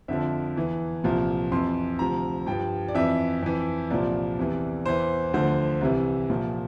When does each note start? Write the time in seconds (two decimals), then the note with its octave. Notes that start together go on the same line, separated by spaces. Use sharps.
0.08 F2 D3 F3 E5
0.56 E2 E3
1.04 C2 A#2 F3
1.52 F2 E3 C6
1.99 D2 C3 F3 A#5
2.47 G2 F3 G5
2.89 D5
2.95 F2 E3 E5
3.43 F2 E3
3.90 C2 A#2 F3 D5
4.39 E2 C3 E3
4.86 E2 E3 C5
5.34 D2 D3 F3 C5
5.81 C2 C3 E3
6.29 C2 A#2 F3